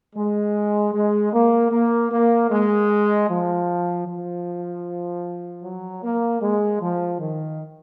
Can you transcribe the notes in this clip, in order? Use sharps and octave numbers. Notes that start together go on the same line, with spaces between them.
G#3
G#3
A#3
A#3
A#3
G#3
F3
F3
F#3
A#3
G#3
F3
D#3